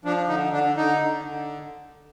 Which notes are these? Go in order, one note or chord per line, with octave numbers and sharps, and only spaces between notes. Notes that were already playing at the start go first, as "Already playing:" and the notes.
F3 D4
D3 D#4
D3 D4
D3 D#4
D3
D3